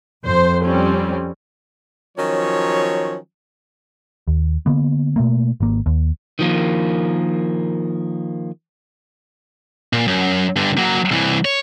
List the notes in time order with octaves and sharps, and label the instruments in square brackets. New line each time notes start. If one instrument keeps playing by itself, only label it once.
[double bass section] F2 [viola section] C5
[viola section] G3 C4 C#4
[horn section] D#3 F3 F#3 C#4 C#5
[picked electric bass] D#2
D3 A#3 B3
B2 A3 A#3
G#1 A#3
D#2
[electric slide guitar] D#3 F3 A#3
[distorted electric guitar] A#2
F#2
G2 D3
F#3 A#3
C2 E3
C#5